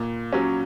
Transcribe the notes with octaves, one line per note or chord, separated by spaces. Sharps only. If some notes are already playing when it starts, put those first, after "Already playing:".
Already playing: A#2
F#3 C#4